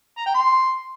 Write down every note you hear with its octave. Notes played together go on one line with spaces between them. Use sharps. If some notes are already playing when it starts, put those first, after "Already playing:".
A#5
G5
C6